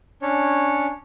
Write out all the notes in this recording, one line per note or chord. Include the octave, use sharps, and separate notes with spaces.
C#4 D4 C#5